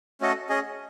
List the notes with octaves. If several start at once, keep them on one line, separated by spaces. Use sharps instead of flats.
A3 C#4 F#4 A4 D#5
C#4 G#4 D#5